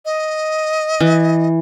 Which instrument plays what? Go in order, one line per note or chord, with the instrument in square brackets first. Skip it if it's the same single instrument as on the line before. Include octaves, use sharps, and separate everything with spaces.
[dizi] D#5
[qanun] E3